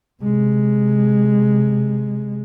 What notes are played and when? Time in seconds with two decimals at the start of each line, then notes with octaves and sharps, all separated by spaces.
0.22 C3 G#3